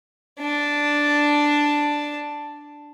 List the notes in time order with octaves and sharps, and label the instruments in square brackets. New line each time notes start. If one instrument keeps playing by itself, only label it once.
[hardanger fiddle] D4 A5